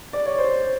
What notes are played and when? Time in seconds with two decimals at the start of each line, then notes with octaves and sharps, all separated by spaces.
0.13 D5
0.26 C#5
0.38 C5